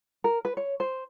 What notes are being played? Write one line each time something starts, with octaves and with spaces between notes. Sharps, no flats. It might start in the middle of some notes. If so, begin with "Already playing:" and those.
A#4
B4
C#5
C5